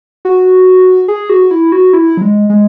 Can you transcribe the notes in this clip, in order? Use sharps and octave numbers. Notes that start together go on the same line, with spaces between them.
F#4
G#4
F#4
E4
F#4
E4
F#3
G#3
G#3